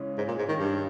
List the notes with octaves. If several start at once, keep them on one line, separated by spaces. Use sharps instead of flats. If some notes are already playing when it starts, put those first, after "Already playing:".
Already playing: C#3 E3 G#3 C#4
G#2
A#2
G#2
D#3
G2